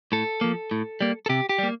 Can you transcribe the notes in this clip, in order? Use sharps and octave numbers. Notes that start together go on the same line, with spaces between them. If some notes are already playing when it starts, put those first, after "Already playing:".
A2 A4
F3 A#3
A2
G3 A#3
A4
C3 G4
G4
G3 A#3